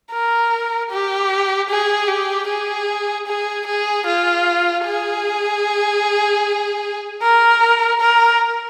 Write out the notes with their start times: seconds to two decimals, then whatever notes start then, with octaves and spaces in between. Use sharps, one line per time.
0.12 A#4
0.90 G4
1.69 G#4
2.08 G4
2.47 G#4
3.27 G#4
3.67 G#4
4.06 F4
4.85 G#4
7.22 A#4
8.01 A#4